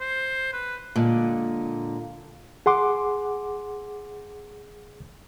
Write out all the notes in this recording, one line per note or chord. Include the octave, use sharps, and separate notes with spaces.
C5
B4
A#2 D3 G#3
G#4 F#5 C6 D6